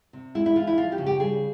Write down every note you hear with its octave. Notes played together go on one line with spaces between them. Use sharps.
C3
G#3 E4
E4
E3 F4
E4
F3 F4
G4
C#3
G4
G3 G#4